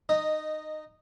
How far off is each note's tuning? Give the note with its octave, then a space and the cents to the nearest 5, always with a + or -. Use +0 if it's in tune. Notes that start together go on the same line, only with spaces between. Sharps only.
D#4 -20 D#5 -5